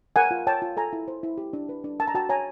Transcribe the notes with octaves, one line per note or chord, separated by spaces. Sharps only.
A#4 F#5 G#5
F4
C#5 G5 A5
F4
A4 G#5 A#5
E4
C5
E4
G4
D4
B4
D4
A#4 A5
A#5
F#4 G5 A5
C#5 G#5 A#5